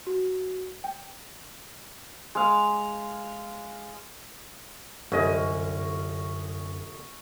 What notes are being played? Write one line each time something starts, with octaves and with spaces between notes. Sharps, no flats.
F#4
G5
G#3 F5
G1 C2 F#2 D3 C#4 D#5